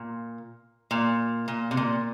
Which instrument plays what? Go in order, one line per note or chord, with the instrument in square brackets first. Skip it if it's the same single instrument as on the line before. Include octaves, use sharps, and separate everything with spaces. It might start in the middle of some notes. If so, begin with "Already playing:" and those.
Already playing: [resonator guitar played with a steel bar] A#2
A#2
A#2
C3
A#2